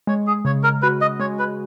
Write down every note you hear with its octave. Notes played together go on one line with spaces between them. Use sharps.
G#3 C#5
G#4
C#3 C#5
A#4
F#4 B4
D#5
G#3 C#5
B4